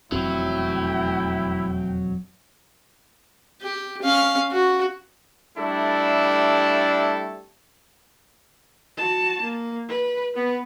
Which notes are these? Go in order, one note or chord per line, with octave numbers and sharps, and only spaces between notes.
E1 F2 F#3 A3 C4 E4 G5
G4
C#4 F5
F#4
G3 A3 D4 E4 A4
F#4 A5
A#3
B4
B3 B4